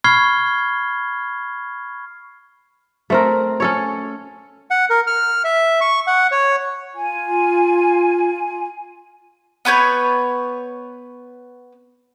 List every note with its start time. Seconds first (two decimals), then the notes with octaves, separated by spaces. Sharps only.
0.04 B5 C#6 F6 G#6 C7 G7
3.10 A3 C4 A#4
3.60 C#4 A4 C#5
4.71 F#5
4.90 A#4
5.07 F6
5.44 E5
5.81 C#6
6.07 F#5
6.32 C#5
6.94 F4 G#5
9.65 B3 B4 C#5 G6